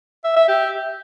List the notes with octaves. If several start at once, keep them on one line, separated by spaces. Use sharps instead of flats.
E5
E5
G4